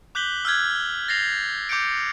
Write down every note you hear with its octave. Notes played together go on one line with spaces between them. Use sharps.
D6 F#6 G6 B6 F#7 G7
E6 F6 G6 G#6
A6 A#6 C7 F7
D6 G6 C#7 D7